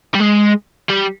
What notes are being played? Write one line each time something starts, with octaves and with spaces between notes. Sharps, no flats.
G3
G#3
G3